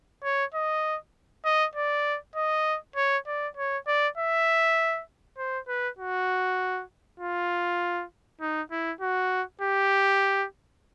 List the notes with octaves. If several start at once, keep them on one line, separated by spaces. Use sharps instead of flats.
C#5
D#5
D#5
D5
D#5
C#5
D5
C#5
D5
E5
C5
B4
F#4
F4
D#4
E4
F#4
G4